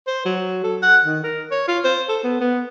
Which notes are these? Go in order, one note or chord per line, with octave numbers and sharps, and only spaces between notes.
C5
F#3
A4
F#5
D#3
A#4
C#5
F4
C5
A4
B3
B3